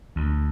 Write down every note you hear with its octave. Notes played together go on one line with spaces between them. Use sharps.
D2